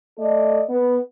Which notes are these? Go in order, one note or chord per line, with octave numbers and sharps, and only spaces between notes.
A3 A4 D5 D#5
B3